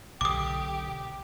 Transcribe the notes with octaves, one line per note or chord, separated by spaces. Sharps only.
B1 D3 G4 D6 D#6